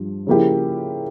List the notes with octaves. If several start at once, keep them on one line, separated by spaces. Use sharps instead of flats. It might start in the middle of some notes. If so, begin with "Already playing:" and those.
Already playing: G2 F3
C#3 F3 A#3 E4 G4